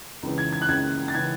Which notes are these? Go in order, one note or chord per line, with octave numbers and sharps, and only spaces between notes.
C#2 C#3 E3
G#6
G#6
F#6
C#2 C#3 E3 G#6
A6
C#3 E3 G#6